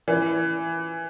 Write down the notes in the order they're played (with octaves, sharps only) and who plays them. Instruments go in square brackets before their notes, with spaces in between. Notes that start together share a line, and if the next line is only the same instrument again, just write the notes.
[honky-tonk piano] E3